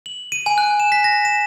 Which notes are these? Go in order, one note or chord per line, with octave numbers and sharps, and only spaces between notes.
F#7
D#7
G#5
F#6
E7
B6
A#6
E7